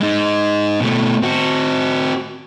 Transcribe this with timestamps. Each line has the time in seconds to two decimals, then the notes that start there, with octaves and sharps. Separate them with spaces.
0.01 G#3 D#4
0.81 B2 A3
1.23 C4 F#4